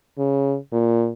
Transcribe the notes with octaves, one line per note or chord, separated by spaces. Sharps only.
C#3
A#2